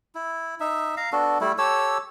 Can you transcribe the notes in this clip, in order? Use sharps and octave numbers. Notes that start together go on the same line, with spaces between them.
E4
D#4 E5
F5 A#5
B3 D4 F#4 A4
G3 A3 E4
G4 A4 C#5 E6